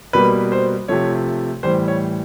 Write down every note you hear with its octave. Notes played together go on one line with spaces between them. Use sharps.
B2 G3 A#3 B4
C5
C3 F3 A3 C#5
A2 E3 G3 C5
C#5